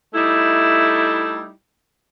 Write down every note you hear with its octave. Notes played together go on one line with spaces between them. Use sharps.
G3 A3 D#4 E4